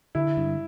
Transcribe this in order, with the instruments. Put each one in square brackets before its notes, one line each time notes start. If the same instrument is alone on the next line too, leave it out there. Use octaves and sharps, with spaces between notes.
[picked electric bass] D3 [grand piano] E4
[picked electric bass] G2